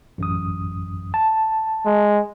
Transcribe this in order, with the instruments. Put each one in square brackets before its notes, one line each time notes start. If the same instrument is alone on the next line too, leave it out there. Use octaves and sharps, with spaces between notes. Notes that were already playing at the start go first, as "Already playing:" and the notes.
[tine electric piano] A1 F#2 D#6
A5
[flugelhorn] G#3